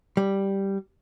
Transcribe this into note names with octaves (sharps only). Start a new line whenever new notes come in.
G3